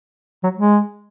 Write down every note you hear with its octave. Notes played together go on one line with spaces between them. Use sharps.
F#3
G#3